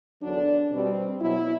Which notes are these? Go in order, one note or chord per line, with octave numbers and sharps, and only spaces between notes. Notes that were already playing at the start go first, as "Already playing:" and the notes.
E2 D3 F#3 D4
B2 G3 C4
B2 F#3 E4